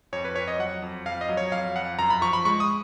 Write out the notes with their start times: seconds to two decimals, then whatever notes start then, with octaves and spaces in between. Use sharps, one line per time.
0.13 F2 C#5
0.25 B4
0.36 F2 C#5
0.48 D#5
0.59 F#3 F#5
0.82 F2
1.05 F2 F5
1.21 D#5
1.29 F#3
1.37 C#5
1.52 F2 F5
1.75 F2 F#5
1.99 F#2 A#5
2.10 B5
2.21 F3 C#6
2.33 B5
2.45 G#3 C#6
2.60 D#6